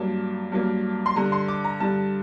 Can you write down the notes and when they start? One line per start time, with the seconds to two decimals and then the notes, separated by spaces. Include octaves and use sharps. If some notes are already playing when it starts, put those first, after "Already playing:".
Already playing: G2 F#3 A#3 A5
0.52 G2 F#3 A#3
1.06 C6
1.16 G2 D3 G3 A#5
1.32 C6
1.48 D6
1.64 A#5
1.80 G2 D3 G3 A5